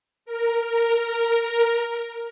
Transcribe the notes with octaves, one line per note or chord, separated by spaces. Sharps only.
A#4
A#4
A#4
A#4